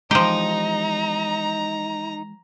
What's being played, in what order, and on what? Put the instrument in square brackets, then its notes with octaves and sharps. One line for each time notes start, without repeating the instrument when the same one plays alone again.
[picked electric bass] E3 G#3 [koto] F3 G4 [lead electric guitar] D#4 [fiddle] A#5